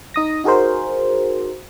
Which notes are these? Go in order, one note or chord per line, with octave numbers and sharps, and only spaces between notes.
D#4 D#6 A#6
D#4 F#4 G#4 A#4 C5